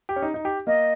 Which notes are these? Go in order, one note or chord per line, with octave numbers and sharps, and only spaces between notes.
G4
C#4
D#4
D#4
G4
A#3 D#5